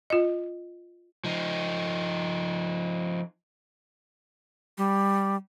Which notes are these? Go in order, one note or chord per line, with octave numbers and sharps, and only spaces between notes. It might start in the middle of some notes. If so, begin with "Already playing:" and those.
F4 D#5
F3 D#4
G3